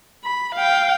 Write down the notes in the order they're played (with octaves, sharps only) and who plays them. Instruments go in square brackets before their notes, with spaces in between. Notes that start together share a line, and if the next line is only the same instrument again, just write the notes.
[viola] B5
F5 G5